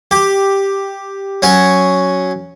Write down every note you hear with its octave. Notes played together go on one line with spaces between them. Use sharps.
G4
F#3 C#4 G#5